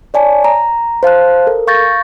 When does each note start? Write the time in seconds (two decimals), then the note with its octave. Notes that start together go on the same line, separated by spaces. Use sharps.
0.14 C#5 D5 G#5 A5
0.44 A#5
1.03 C5 F5 A5 F#6
1.47 A4 A#4
1.67 F5 C#6 G6 A6 A#6